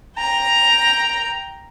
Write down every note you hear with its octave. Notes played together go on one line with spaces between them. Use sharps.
G5 A#5